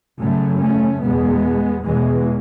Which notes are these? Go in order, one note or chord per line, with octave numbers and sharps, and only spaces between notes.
F#2 C#3 F#3 A3
A3 C#4
E2 B2 G#3 B3
E2 B2 E3 G#3